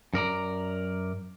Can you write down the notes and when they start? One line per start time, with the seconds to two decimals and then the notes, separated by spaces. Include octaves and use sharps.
0.13 F#2 A#4 D5 A#5